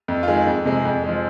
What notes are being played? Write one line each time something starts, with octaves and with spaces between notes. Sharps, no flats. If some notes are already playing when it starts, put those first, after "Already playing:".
F2
F4
D#3 G#3 G#4
F2
C3 G#3
F2
G#3
F3